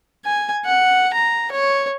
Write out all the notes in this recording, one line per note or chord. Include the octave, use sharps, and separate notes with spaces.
G#5
F#5
A#5
C#5